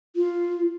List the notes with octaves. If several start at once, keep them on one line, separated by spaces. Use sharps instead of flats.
F4